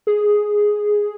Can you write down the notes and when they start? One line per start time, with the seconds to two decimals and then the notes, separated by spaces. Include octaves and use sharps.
0.07 G#4